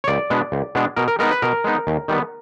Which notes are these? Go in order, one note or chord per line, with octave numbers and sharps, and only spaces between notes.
C#5
C#2 D5
B2 G#3 B3 D4
C#2
B2 G#3 B3 D4
B2 A#4
A#4
G#3 B3 D#4 A#4
B4
B2 A#4
G#3 B3 D#4
D#2
D#3 G3 B3